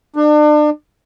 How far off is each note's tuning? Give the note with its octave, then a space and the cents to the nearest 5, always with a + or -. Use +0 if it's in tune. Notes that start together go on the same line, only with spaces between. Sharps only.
D4 +35